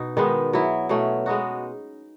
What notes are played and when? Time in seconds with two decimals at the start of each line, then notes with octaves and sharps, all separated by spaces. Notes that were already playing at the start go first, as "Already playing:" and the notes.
Already playing: B2 D#4
0.17 D#3 G#3 B3
0.53 F#3 B3 E4
0.89 B2 F#3 A3 C#4
1.26 G#3 B3 D#4 F#4